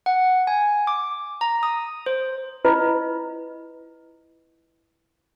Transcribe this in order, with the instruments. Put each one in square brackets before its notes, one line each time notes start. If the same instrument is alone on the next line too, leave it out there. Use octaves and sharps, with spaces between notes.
[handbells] F#5
G#5
D6
A#5
D#6
C5
[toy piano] E4 F4 B4 D#5